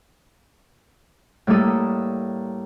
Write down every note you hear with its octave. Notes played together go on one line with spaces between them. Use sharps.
A2 G3 A#3 A4 D#6